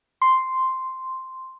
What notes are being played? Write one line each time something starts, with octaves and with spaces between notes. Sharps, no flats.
C6